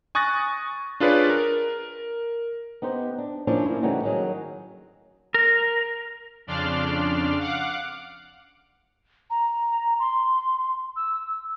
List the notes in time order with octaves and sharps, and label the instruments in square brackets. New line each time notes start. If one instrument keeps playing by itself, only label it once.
[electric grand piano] G#5 C#6 D#6 F#6 A6 A#6
D4 F4 G#4 B4 C#5 D5
A#4
[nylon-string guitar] B3 D#4 G4 C5
D4
F3 A#3 C#4 D4 E4
F3 A#3 E4
C#3 E3 G3 A3 D#4 F#4
D#3 F#3 G#4
[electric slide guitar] A#4
[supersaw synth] F2 C#3 D4 D5 C6 F6
F5 F#5 D6
[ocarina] A#5
C6
E6